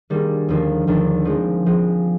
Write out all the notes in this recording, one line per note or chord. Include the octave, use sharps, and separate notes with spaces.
D#3 G3 A#3 D4 G#4
D#2 D3 F3 A#3 D4
D#2 D3 F3 A#3 D4
F3 G#3 C4
F3 G#3 C4